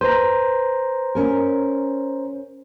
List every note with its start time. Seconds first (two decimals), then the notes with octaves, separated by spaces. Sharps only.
0.01 B4 C5 A#5
1.15 C#4 A#4